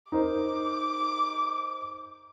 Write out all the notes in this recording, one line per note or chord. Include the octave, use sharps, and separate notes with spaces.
D#4 A#4 C5 D6